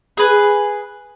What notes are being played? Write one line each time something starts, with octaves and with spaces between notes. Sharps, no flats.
G#4 B4